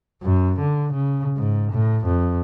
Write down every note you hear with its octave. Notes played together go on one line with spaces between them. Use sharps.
F#2
D3
C#3
G#2
A2
F2